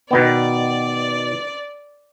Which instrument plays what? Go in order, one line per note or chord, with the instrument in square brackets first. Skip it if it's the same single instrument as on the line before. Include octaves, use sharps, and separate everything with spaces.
[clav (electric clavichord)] B2 D#3 B3 [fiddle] D5